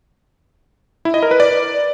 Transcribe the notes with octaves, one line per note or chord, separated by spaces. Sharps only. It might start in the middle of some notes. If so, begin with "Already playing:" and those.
E4
D#5
A#4
B4
D5